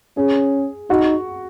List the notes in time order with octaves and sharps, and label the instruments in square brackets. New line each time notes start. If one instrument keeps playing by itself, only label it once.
[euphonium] C#4 [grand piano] G#4
[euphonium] D#4 [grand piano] F#4